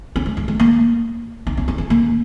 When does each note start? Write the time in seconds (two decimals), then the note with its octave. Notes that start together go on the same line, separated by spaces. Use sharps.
0.16 C#4
0.26 G#3
0.37 F#3
0.48 G#3
0.60 A#3
1.47 D#4
1.57 C#4
1.68 C#4
1.78 C#4
1.90 A#3